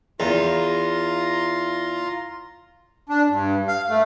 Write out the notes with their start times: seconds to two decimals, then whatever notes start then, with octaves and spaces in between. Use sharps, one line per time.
0.20 E2 F4 A#5 C6
3.09 D4
3.30 G2
3.68 F5
3.89 A3